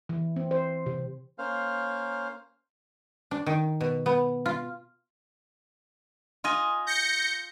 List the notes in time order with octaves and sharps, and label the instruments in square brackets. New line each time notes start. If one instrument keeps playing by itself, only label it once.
[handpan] E3
C4
C5
C3
[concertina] A#3 C#4 C5 F5
[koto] D4
D#3
B2
B3
F4
[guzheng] F4 D#5 G#5
[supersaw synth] G6 A#6 C#7